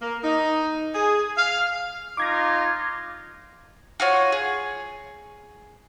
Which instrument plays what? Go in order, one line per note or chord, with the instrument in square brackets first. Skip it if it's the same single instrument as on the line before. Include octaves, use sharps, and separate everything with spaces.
[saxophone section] A#3
D#4
G#4
F5
[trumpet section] D#4 F4 [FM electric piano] D6 G#6 A#6
[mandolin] F4 F#4 C#5
G#4